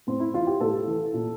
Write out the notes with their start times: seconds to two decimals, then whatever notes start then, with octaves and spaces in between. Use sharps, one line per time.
0.07 A2 C4
0.20 E4
0.33 E3 F4
0.47 G4
0.61 A2 A4
0.87 E3
1.14 A#2